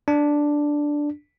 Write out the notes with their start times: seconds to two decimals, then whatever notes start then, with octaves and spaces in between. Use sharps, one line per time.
0.08 D4